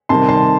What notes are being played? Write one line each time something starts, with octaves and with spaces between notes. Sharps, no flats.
C3 D#3 G3 A5 C6
A5 C6